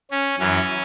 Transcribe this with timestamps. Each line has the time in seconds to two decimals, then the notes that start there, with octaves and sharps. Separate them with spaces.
0.11 C#4
0.39 F#2 E3 C#4